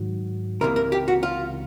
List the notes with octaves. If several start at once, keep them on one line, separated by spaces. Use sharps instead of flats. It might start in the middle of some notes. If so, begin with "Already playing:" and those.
Already playing: G#2 D#3 F#3
C#2 C3 E3 G3 A#3 A#4
A#4
G4
F#4
F4